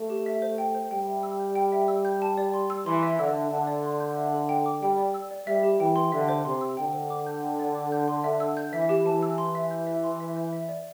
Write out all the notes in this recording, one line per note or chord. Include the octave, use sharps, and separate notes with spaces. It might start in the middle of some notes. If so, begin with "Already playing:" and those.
Already playing: A3
G4
E5
C5
G5
C5
G3 G5
E5
E6
G6
G5
E5
E6
G6
A5
D5
C6
E6
E3 C6
E5
D3 E6
E5
D3 A5
D5
C6
G6
E5
A4
G5
D6
G3 G5
D5
E6
D5
G3 E5
G4
E3 G5
C6
D3 E5
C5
C3 C6
E6
D3 G5
C5
D6
G6
G5
D5
D6
G6
C6
E5
E6
G6
E3 E5
G4
E3 A5
E6
C6
E5
G6
E5
C6
E5
G6
E5
D5